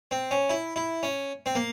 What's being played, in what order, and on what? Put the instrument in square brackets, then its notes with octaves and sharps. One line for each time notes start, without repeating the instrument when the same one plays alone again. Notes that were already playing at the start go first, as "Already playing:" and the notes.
[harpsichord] C4
C#4
E4
E4
C#4
C4
A#3